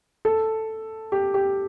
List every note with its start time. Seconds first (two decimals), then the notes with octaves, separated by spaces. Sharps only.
0.25 A4
1.12 G4
1.34 G4